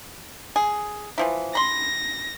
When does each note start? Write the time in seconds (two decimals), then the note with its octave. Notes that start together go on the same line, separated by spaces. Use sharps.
0.56 G#4
1.18 E3 F3 E4
1.55 B5 C6 A#6